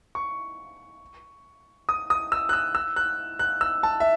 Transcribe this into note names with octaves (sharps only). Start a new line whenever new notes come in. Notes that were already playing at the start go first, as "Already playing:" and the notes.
C#6
D#6
D#6
E6
F#6
E6
E6
F#6
F#6
E6
A5
E5